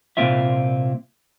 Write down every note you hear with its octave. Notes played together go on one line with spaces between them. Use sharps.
C2 A#2 C4 F4 E5